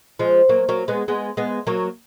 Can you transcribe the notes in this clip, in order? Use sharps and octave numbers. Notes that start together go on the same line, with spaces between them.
F3 G#3
F#3 A#3
F#3 A#3
G#3 B3
G#3 B3
G#3 B3
F#3 A#3